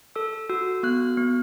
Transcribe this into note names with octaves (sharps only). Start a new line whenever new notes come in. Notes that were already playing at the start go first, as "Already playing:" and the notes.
A4 E6
F#4 E6
B3 F#6
B3